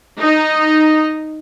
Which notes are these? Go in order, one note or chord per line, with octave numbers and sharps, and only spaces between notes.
D#4